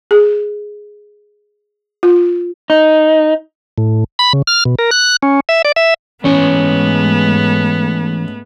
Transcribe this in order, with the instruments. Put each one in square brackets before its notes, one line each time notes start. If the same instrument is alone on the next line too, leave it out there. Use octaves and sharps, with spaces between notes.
[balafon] G#4
F4
[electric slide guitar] D#4
[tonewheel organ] A2
B5
C#3
F6
B2
A#4
F#6
C#4
E5
D5
E5
[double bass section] G#2 G#3 A3 [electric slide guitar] E3 C#5 G#5 [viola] B3 [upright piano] C#4